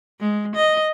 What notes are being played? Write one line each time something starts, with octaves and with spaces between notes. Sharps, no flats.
G#3
D#5